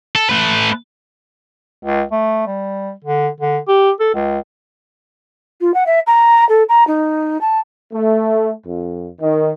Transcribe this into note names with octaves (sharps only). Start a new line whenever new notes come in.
A4
A3 B4
C#2
A3
G3
D3
D3
G4
A4
C#2
F4
F#5
E5
A#5
A4
A#5
D#4
A5
A3
F2
D#3